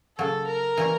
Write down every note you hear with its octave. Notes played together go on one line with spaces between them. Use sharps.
C#3 F#3 A#3 A4
A#4
E3 G3 A#3 C#4